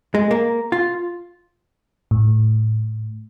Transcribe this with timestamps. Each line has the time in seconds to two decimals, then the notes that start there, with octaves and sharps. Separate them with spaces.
0.15 G#3
0.31 A#3
0.72 F4
2.11 A2